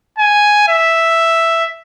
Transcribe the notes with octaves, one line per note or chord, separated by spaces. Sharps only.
G#5
E5